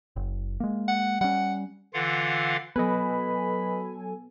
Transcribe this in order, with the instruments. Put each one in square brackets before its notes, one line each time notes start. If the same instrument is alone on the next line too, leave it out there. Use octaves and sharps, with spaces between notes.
[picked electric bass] F#1
G#3 A#3
[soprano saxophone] F#5
[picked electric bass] G3 C#4 [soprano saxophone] F#5
[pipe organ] D3 E3 F4 F5 F#5
[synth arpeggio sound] F#3 A4 G#5 [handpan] B3 [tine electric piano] B4 D#5 [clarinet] B5